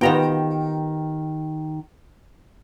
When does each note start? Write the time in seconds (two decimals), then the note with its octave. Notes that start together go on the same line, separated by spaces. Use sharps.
0.01 D#3 B3 F4 G4 G5 A#5